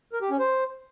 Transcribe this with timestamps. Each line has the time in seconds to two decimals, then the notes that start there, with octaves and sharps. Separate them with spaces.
0.13 A#4
0.22 G4
0.30 C#4
0.39 C5